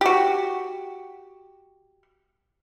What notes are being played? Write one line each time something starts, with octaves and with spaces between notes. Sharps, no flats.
F#4 G4